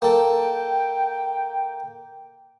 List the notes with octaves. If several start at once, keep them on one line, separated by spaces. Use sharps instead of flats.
A#3 A4 G5